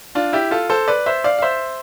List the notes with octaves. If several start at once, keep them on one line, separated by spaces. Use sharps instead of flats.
D4 F4
E4 G4
F4 A4
A4 C5
B4 D5
C5 E5
D5 F5
F5
C5 E5